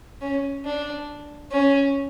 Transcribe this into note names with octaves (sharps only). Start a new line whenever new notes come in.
C#4
D4
C#4